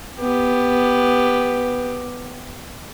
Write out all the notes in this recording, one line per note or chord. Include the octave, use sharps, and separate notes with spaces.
B3 G4